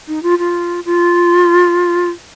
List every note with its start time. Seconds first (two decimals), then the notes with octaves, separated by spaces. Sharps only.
0.08 D#4
0.23 F4
0.39 F4
0.85 F4